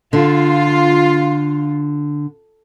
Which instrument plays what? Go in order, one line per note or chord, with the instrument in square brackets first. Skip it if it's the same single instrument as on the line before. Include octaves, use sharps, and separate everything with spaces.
[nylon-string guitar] D3 [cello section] F4